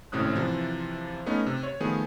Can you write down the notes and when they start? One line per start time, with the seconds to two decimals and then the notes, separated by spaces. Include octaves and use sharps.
0.12 G#1 A2 C3 C#4 D#6 F#6
0.35 C3 E3 F3
1.26 A3 B3 C#4 D#4
1.46 C3
1.63 C#5
1.80 D#3 F3 A3 B3 G#4